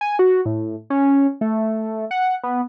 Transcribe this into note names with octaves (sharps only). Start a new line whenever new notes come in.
G#5
F#4
A2
C#4
A3
F#5
B3